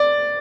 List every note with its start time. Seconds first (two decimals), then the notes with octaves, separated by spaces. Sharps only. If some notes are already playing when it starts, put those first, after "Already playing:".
Already playing: D5